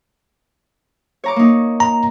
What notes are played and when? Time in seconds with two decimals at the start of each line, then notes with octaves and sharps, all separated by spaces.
1.24 C#5 A#5 D6
1.36 A#3 D#4
1.80 A#5